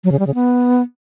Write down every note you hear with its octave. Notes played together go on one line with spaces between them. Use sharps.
F#3
C#3
G3
C#3
B3